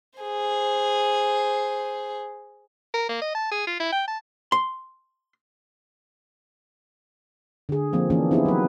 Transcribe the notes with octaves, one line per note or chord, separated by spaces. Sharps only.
G#4 C5
A#4
A#3
D#5
A5
G#4
F4
E4
G5
A5
C6
D3 G#4
F3 A#3 C4
E3 A#3 C#4 D4 G#4
B3 C4 D#4 E4 G4 G#4
F#3 B4